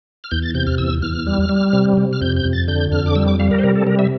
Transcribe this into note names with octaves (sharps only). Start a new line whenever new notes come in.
F6
E2 G6
A6
C3 G6
F6
E2 E6
E2 F6
G3
G3
C3
C3
F6
F2 G6
G6
F2
A6
D3 G6
F2 F6
D6
G3 E6
D6
G3 F5
A#4
C5
C3 A#4
A4
G3 A#4
E5